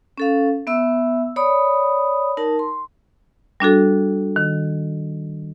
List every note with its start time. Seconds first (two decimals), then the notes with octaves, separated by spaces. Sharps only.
0.18 C#4 A4 F5
0.67 B3 E5 E6
1.36 C#5 D5 B5 D#6
2.37 D#4 A#4 A5
2.59 C6
3.60 G3 D4 F#4 A4
4.36 D#3